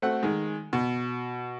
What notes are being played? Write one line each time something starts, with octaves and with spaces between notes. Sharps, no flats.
A3 C4 F#4 F#5
D#3 G#3
B2